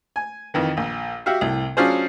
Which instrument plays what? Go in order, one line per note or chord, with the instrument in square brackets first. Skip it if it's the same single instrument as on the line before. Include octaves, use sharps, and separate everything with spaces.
[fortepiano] G#5
F2 D#3 E3
A#1
F#4 G4 E5 F5
C2 A2
F#3 C#4 D4 F4 G#4 C5